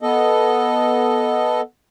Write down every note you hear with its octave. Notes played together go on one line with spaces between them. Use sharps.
B3 A4 D#5